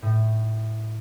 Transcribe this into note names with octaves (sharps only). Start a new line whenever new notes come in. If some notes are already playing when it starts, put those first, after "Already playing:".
A2